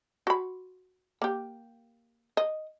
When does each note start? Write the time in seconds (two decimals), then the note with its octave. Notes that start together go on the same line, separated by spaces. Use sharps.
0.27 F#4 B5
1.22 A#3 G4
2.37 D#5